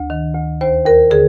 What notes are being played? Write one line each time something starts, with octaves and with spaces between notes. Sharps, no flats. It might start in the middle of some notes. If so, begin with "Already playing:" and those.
Already playing: D2
D#3
D2
D#2 C5
D#2 A#4
D3 G#4